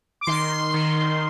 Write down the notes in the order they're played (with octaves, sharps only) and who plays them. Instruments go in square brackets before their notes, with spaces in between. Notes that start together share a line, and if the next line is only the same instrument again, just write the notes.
[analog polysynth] D6
D#3 C6
D#3